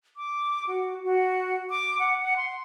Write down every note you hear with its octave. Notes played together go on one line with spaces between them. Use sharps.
D6
F#4
F#4
D6
F#5
F#5
C6